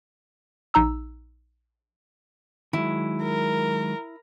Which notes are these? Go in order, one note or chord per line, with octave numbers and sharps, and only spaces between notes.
A#1 D#4 A#5 E6
D#3 F#3 G#3 E4
A#4